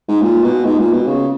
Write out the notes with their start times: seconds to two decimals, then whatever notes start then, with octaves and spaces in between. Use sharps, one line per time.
0.08 G#2
0.22 A#2
0.44 B2
0.65 G#2
0.79 A#2
0.93 B2
1.07 C#3